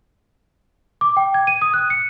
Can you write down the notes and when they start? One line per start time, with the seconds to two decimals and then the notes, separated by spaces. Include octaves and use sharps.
1.01 D6
1.17 G5
1.34 G#6
1.47 D#7
1.62 D#6
1.74 F#6
1.90 C#7